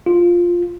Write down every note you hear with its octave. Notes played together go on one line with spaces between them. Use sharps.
F4